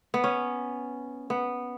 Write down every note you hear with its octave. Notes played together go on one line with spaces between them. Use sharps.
B3
C#4
B3